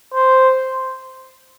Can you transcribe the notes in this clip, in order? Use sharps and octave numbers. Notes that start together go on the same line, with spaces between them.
C5